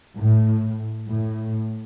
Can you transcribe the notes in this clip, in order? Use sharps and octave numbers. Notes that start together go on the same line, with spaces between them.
A2
A2